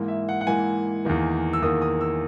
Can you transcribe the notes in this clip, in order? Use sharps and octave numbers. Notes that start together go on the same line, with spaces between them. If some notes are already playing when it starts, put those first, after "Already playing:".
Already playing: G#2 E3 A#3
E5
F#5
F#5
G#2 E3 A#3 G#5
E2 D#3 A#3
E6
E2 D#3 A#3 D#6
D#6
E6